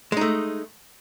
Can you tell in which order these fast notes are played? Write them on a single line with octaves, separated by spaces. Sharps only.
G#3 D#4 A3